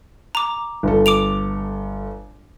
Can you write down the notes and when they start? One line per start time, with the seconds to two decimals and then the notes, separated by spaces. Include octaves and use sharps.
0.35 A#5 D6
0.83 G1 A4
1.06 D6 D7 F7